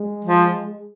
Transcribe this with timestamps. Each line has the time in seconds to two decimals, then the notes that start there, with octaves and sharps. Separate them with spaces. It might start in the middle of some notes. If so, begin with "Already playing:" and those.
Already playing: G#3
0.25 F3